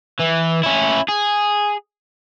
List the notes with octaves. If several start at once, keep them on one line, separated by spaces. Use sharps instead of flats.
E3
C#4 E4
G#4